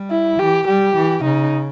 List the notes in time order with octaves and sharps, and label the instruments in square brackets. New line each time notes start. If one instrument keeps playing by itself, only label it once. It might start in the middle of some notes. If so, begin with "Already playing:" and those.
Already playing: [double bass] G3
[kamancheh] E4
[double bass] E3 [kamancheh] G4
[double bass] G3 [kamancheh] G4
[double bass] E3
[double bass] C#3 [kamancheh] D#4